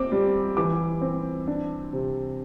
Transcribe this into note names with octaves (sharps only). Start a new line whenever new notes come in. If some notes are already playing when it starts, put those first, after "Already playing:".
Already playing: C4 D6
G3
E3 D6
C4
D4
C3